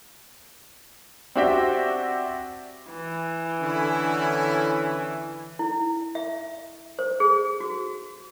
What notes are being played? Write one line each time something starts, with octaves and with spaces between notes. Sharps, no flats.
C4 D4 F#4 G4 E5 G5
E3
D3 C#4 E4
E4
E5
C5
G#4
F#4